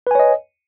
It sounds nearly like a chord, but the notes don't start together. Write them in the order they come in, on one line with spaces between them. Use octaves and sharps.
B4 G#5 C#5 D#5